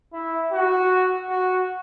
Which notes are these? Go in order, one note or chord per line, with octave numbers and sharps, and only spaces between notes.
E4
F#4
F#4